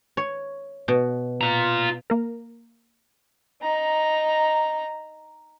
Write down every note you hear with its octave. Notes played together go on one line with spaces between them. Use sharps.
C#5
B2
F4 A#5
A#3 A#4
D#4 A#5